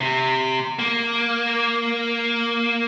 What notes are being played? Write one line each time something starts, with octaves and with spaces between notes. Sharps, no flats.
C3
A#3